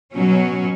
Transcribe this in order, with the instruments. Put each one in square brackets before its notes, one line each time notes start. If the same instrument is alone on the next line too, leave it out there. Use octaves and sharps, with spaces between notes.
[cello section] B2 F#3 C#4